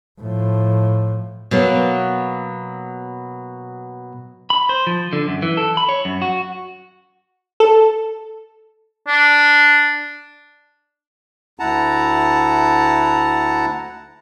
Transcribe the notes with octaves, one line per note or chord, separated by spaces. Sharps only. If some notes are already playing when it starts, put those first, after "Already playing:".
A2 F3
B2 F#3 A#3 B3
B5
C5
F3
D3
F#2
E3
A4
B5
C#5
F#2
F#4
A4
D4
D2 E4 F#5 A5 A#5